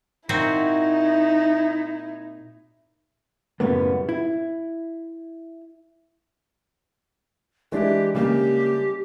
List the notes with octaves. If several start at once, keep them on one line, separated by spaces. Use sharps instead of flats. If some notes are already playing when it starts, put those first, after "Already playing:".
A#2 C4 D#4 E4 F#4
F#2 A2 C#3 G3 A#3 B3
E4
E3 G#3 D4 E4 G4
C#3 G3 A#3 G4